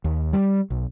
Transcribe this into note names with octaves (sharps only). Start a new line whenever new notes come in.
D#2
G3
B1